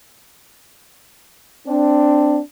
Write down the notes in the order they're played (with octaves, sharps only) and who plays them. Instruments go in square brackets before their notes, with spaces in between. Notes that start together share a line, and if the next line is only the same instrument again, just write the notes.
[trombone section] C4 D4